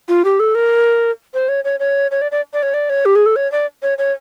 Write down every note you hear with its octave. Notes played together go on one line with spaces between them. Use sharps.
F4
G4
A4
A#4
C5
C#5
C#5
C#5
C#5
D5
D5
D5
C#5
D5
C#5
G4
G#4
A4
C#5
D5
C#5
C#5